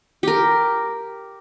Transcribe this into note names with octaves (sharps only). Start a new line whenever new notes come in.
G4 A#4